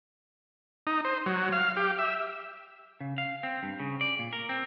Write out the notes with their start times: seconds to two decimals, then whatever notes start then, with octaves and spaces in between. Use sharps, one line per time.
0.87 D#4
1.05 C5
1.26 F#3
1.52 F5
1.77 G4
1.99 E5
3.00 C#3
3.18 F5
3.43 C4
3.63 G2
3.80 C#3
4.01 D5
4.19 A#2
4.33 A#4
4.49 C4